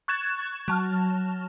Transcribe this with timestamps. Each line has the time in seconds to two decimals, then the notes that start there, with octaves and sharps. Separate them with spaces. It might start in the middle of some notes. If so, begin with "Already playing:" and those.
0.08 C#6 F#6 G#6 A6 E7
0.68 F#3 A5 F6